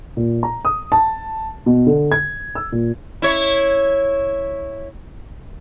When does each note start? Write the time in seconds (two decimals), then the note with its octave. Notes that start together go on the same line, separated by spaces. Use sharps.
0.17 A#2
0.43 A#5
0.65 D#6
0.92 A5
1.66 B2
1.87 D3
2.12 G#6
2.55 E6
2.72 A#2
3.22 E4 C#5